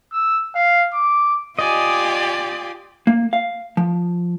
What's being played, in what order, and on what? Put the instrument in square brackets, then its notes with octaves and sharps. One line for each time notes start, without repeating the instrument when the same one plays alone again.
[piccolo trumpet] E6
F5
D6
[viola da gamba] F4 G4 [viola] D5 G#5 [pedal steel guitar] D#5
[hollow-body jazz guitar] A#3
F5
F3